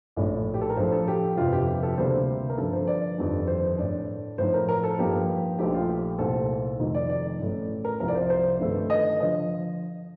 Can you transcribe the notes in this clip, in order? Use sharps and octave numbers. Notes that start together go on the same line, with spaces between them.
A#1 A2 A3 D#4 D5
G4
A4
A#4
A2 F3 A3 D4 C5
A4
G4
G1 F2 C3 F4
G4
G4
A4
D2 C3 G3 A#3 D4 C5
A#4
G2 D3 F3 A4
C5
D5
G1 F2 D#3 G3 D4
C5
A2 A3 D4 D5
A2 F3 C4 D#4 C5
A#4
A#4
A4
G2 F3 A#3 D#4 G4
A#1 A#2 F3 A3 D#4 G4
F4
G4
C2 A#2 A3 C4 D#4 A4
F1 F2 D#3 A3 D#4
D5
D5
A1 A2 A3
A#4
C2 C3 F3 A#4
D5
C5
C5
G1 G2 D#3 A3
D#5
D3 F3 D#5